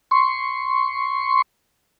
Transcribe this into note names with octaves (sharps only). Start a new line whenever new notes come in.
C6 C#6